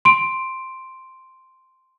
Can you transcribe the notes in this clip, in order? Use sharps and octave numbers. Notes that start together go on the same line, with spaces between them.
C6 D7